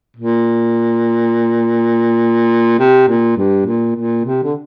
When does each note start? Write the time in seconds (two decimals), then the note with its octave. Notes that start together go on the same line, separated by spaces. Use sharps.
0.17 A#2
2.79 C3
3.08 A#2
3.37 G2
3.66 A#2
3.96 A#2
4.25 C3
4.44 D3